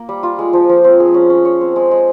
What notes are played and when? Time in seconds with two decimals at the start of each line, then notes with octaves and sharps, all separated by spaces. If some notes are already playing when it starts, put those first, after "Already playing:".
Already playing: A#3
0.09 G3
0.23 F4
0.39 G#3
0.53 F3
0.69 F3
0.84 C4
1.00 G#4
1.14 C#4
1.30 C#4
1.45 C#5
1.61 C4
1.76 G#3
1.91 G#3